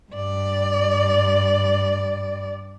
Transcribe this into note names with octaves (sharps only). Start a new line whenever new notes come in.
G2 D5